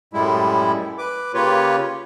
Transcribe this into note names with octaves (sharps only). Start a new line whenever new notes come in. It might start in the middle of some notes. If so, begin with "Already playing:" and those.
F#2 A2 G3 G#3 E4
B4 D6
C#3 A#3 F4 G4 B4 C#5